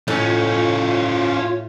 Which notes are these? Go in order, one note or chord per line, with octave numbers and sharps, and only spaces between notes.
A2 C#4 D#4 F4